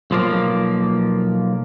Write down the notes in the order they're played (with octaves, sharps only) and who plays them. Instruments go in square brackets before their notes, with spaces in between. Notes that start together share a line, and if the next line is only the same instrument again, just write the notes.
[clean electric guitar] B1 F3 A#3